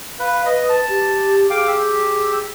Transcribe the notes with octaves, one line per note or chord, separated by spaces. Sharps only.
B4 F5
B4 D#5
A5
G4
G#4 F5 G5 D6
G4 E6